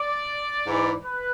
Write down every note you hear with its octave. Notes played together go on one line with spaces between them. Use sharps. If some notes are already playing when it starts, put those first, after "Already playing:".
Already playing: D5
G#2 E3 G#3
B4